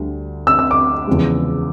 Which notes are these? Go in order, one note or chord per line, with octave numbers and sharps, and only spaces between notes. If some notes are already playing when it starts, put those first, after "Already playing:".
Already playing: D2 D3 G3
E6
E6
D6
E2 C#3 F3 G#3